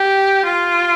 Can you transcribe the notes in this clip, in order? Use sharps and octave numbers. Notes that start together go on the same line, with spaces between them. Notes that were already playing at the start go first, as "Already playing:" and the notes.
Already playing: G4
F4